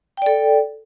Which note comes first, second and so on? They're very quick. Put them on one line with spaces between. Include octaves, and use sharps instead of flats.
G5 D5 A4